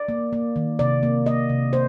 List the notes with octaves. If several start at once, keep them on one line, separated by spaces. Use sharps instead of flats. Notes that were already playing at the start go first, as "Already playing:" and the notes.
Already playing: D5
A#3
A#3
D#3
C3 D5
A#3
A#3 D#5
C3
A#3 C5